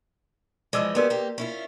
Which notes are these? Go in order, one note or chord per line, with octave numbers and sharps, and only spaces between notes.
E3 F3 G#3 D5 D6 E6
B3 G4 G#4 A#4 D5 C6
A#3 G4
C#4 E4 F4